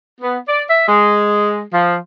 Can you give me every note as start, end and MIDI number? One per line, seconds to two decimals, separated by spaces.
0.21 0.38 59
0.48 0.62 74
0.70 0.87 76
0.87 1.61 56
1.73 1.96 53